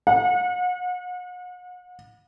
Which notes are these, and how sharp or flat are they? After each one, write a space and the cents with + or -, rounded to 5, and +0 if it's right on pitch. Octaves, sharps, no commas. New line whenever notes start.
F#5 -40